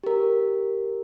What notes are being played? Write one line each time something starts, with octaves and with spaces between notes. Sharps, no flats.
G4 A#4